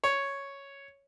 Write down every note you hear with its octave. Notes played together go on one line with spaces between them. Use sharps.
C#5